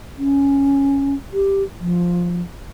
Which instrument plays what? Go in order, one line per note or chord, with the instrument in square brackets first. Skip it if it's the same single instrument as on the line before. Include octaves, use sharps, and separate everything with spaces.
[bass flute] C#4
G4
F3